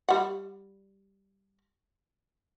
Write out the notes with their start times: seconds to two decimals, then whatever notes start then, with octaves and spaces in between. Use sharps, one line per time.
0.09 G3 F#5